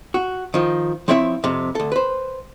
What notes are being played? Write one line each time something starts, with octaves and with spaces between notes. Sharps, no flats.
F#4
D#3 F3
F3 C4 E4 C#5 E5
F2 C3
D2 A4
B4 C5